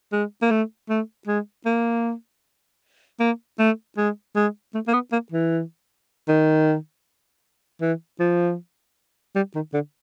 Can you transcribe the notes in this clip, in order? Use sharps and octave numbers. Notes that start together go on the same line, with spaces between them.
G#3
A#3
A3
A3
G#3
A#3
A#3
A3
G#3
G#3
A3
A#3
B3
A#3
E3
D#3
E3
F3
G3
D#3
D3